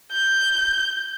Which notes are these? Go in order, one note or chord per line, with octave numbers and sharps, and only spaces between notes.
G6